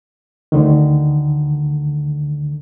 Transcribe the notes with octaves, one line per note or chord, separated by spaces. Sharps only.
D2 D3 D#3